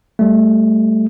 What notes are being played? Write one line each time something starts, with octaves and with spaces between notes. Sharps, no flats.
G3 A3